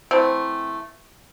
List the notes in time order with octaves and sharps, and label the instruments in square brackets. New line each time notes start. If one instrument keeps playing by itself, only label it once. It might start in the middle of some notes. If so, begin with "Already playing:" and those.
[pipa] E3 A3 C4